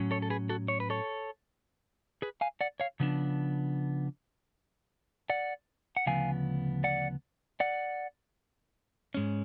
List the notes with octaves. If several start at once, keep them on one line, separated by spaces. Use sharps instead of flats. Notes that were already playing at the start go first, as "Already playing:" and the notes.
Already playing: A2 F#3 C#4
A4 C#5
A4
G#4 B4
F#4 A4
C#5
B4
A4 C#5
G#4 B4
F5 G#5
D5 F#5
C#5 F5
C#3 F3 B3 D4
D5 F#5
F#5
D2 C#3 F3 B3 F5 G#5
D5 F#5
D5 F#5
G#2 G#3 C#4